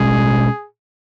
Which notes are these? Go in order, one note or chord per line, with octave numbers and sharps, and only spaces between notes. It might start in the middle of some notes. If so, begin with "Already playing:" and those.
Already playing: B2 G#3 C#4 G#4